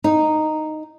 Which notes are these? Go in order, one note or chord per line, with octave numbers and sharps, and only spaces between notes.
D#4